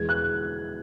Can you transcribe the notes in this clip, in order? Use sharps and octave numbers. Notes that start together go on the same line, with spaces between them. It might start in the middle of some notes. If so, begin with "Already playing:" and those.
Already playing: E2 B2 G#3 G#6
F#6